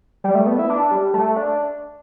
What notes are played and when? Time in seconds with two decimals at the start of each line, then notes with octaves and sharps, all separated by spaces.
0.24 G3
0.35 A3
0.46 B3
0.59 E4
0.70 D4
0.91 G3
1.14 A3
1.36 D4